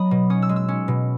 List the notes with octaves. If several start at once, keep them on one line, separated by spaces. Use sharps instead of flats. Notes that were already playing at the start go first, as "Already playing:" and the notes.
Already playing: F#3 B3 D#5 B5 D#6
B2
C#4 D#6
E6
G#3
E6
C#4
B2